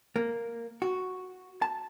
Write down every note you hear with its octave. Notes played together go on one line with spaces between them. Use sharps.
A#3
F#4
A5